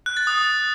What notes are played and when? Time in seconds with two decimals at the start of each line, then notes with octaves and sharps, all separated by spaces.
0.06 F#6
0.17 A6
0.27 D#6